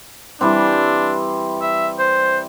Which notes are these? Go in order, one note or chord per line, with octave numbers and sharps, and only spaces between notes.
E3 G3 C4 D4
E5
C5